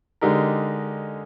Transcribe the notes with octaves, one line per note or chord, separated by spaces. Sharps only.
D3 G#3 D#4 G4 A#4